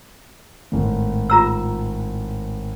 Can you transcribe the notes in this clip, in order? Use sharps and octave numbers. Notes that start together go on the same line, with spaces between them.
G#1 A2
F4 A#5 E6